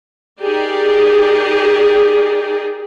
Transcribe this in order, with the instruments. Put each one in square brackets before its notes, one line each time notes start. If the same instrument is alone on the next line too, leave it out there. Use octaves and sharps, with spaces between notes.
[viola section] D#4 G4 G#4 A#4 D5